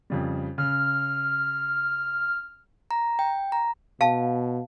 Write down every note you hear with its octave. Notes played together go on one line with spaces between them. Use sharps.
F2 C#3 G3
C#3 F6
A#5
G5
A#5
B2 F5 A5